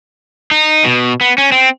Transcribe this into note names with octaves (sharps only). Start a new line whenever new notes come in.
D#4
B2
B3
C#4
C4